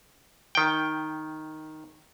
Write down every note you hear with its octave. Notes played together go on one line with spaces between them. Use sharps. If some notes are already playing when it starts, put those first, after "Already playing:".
D#3 G5